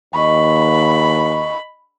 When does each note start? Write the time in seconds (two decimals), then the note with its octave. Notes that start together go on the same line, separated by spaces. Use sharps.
0.15 D#2 D#5 B5 C#6